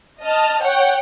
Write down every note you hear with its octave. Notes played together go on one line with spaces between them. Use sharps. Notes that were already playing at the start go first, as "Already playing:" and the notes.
D#5 A5 F6
C#5 F#5 G5